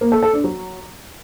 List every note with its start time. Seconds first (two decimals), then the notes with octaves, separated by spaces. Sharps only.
0.01 A#3
0.12 A4
0.23 A4
0.33 D4
0.44 F#3